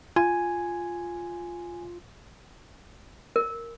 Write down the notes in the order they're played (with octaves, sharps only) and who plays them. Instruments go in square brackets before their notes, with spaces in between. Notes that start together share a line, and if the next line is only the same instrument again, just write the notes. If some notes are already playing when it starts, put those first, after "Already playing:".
[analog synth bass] F4 [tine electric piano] G#5
[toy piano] A#4